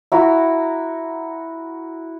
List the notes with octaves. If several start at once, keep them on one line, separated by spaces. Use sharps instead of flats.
E4 F#4 A#5